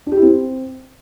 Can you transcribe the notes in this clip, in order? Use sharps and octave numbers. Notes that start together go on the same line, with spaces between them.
D4
G4
E4
C4